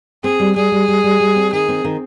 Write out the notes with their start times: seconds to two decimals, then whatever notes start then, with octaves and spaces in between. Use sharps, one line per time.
0.24 C4 G#4
0.40 G3
0.56 G3 G#4
0.72 G3
0.88 G3
1.04 G3
1.20 G3
1.36 C4
1.53 D#3 G#4
1.69 C4
1.84 D#3